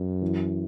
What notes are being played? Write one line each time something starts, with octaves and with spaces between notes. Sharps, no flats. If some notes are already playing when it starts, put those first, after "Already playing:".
Already playing: F#2
E3